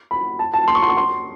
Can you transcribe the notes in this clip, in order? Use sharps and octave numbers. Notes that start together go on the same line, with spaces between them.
B5
A5
A5
C6
C#6
C6
C#6
C6